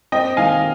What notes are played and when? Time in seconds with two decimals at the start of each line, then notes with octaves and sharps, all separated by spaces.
0.12 C4 D#5 G5
0.37 D#3 F5 G#5